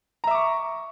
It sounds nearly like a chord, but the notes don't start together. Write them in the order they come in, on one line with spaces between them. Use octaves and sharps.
A#5 E5 D6 C#6